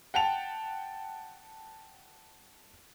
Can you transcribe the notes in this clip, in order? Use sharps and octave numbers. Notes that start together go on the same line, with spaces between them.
F#5 G5 A5 F7